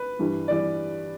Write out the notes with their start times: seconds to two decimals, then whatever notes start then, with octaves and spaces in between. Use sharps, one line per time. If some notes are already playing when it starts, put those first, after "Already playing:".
Already playing: B4
0.19 G2 E3 G3
0.48 E3 G3 D5